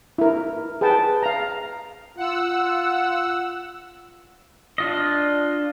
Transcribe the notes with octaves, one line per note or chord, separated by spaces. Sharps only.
E4 A#4
G#4 B4 G5 A5
F5 A#5
F4 F#5 E6
D4 F4 D#5